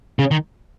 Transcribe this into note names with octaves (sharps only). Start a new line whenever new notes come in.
C#3
D#3